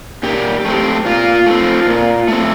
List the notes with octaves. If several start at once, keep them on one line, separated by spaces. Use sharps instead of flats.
A#2 G4
A3 C4
A#2 F4
A3 C4
A#2
A3 C4